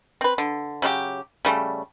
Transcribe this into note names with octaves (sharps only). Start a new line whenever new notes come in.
C4 B4
D3
C#3 F#3 F4 G4
C#3 G3 A3